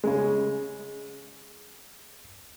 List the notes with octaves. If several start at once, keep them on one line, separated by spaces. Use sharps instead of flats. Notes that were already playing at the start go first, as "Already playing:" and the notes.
C#3 G#3